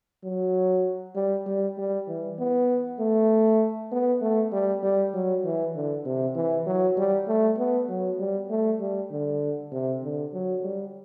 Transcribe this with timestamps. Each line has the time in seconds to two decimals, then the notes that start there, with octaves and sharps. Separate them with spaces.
0.24 F#3
1.16 G3
1.46 G3
1.78 G3
2.08 E3
2.39 B3
2.99 A3
3.92 B3
4.21 A3
4.52 G3
4.83 G3
5.13 F#3
5.44 E3
5.75 D3
6.05 C3
6.35 E3
6.66 F#3
6.97 G3
7.28 A3
7.58 B3
7.89 F#3
8.19 G3
8.50 A3
8.80 G3
9.11 D3
9.72 C3
10.03 D3
10.33 F#3
10.64 G3